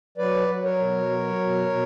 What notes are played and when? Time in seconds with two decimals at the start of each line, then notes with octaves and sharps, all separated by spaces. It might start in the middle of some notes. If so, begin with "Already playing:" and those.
0.17 F#3 B4 D5
0.48 F#3
0.64 A#4 C#5
0.78 B2
1.10 F#3
1.39 B2
1.69 B2